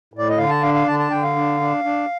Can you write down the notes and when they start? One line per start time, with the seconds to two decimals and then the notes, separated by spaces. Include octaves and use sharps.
0.14 A2 D5
0.29 D#5
0.38 D3 F5
0.50 A5
0.62 D4 F5
0.74 F5
0.87 D3 A5
0.99 A5
1.11 D3 G5
1.23 F5
1.36 D4
1.61 D4
1.84 D4